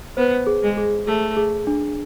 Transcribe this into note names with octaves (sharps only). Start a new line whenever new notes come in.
B3 C5
G#4
G#3
G#4
A3 G#4
G#4
D4